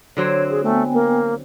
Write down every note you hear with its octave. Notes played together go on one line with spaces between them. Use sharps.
D3 F#3 C4 C#5
G#4
A3 B3 G5 G#5
A#3